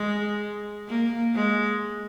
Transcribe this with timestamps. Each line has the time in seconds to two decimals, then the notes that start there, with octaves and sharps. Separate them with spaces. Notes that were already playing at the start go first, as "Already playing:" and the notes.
Already playing: G#3
0.89 A#3
1.35 G#3